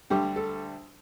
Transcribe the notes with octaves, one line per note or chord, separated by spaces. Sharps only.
D2 D3 G3 G4
A4